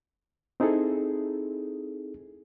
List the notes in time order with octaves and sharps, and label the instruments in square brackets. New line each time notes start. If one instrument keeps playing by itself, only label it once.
[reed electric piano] C4 D#4 E4 G#4 A4